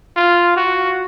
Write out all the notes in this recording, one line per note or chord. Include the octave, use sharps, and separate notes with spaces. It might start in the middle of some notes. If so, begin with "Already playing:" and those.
F4
F#4